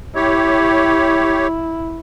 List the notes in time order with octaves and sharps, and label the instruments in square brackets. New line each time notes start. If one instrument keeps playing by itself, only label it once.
[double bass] E4 [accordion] G4 C#5